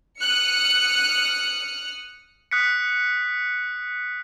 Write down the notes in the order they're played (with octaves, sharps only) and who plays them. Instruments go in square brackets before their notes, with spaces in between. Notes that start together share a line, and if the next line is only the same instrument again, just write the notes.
[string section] D#6 F6 F#6 C#7
[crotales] D#6 F#6 B6 C#7